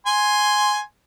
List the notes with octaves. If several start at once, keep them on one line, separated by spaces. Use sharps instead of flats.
G#5 C6